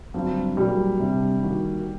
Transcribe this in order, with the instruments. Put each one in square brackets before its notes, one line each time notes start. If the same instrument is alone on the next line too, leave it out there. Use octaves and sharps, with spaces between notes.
[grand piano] G1 G2 F#3 C4 F#4
[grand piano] A#2 F#3 A#3 F#4 A#4 [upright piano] G3
[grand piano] C3 G3 D4
D#3 G3 A#3 F#4